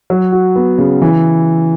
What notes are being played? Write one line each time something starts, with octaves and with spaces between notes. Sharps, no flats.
F#3
F#4
B3
C#3
E3